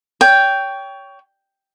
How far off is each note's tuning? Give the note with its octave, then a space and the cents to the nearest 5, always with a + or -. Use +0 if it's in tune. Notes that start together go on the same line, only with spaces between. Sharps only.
C#5 +25 G5 +0